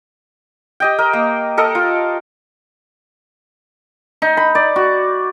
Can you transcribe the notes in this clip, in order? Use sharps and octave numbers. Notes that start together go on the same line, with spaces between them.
G4 D#5 G5
A#4 D#5
A#3
A4 A#4 D#5
F4
D#4
B5
D5
F#4